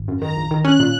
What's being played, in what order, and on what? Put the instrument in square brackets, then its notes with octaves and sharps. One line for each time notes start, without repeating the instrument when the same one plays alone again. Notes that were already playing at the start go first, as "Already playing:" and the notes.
Already playing: [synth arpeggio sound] G#1
F#2
[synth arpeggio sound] D#3 [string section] A#5
[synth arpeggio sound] A#1
D#3
[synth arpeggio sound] C#4 [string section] F#6
[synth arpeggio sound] A#2